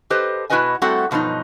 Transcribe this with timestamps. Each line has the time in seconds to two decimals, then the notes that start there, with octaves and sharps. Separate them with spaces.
0.10 G4 A4 B4 C5 D#5
0.50 B2 E4 F#4 B4 D#5 G#5
0.82 G3 A3 C4 F#4 A4 F#5
1.11 G2 B2 F3 F#3 D#4